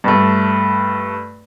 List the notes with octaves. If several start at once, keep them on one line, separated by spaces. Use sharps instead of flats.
G2 A3